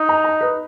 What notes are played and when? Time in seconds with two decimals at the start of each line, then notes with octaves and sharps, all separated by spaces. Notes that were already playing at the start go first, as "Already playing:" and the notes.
Already playing: D#4
0.09 A#5
0.24 A#5
0.41 B4